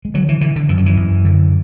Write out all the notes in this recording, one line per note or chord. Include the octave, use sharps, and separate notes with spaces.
G#3
D3 F#3
E3
D3 E3
D3
F#2 E3
F#3
E3
F#2
D3